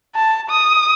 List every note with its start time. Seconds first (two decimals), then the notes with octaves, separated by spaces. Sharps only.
0.15 A5
0.50 D#6